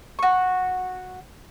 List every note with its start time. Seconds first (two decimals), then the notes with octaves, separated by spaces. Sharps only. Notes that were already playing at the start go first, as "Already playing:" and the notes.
0.19 F#4 C#6